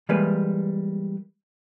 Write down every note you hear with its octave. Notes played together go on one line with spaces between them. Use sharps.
E3 G3 G#3 A#3 B4